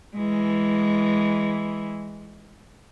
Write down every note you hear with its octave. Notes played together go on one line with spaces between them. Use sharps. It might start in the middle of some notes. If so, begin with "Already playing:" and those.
E3 G#3